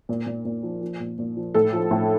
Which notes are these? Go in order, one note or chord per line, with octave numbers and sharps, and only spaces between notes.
A#2
A#2
A#2
F3
F3
A#2
A#2
F3
A2 A4
F3
A2